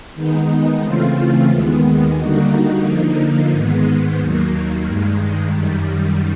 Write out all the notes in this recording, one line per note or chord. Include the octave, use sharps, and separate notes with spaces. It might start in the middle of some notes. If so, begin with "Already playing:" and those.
D#3 G#3 B3 D#4
C#3 E3 A3 C4 F4
D#2 D#3 G#3 B3
D3 G3 A#3 D#4 F#4
D3 F3 A#3 D#4
G#2 D#3 G#3 B3
D#2 D#3 F#3 A#3
G2 D#3 G#3
F#2 D#3 G3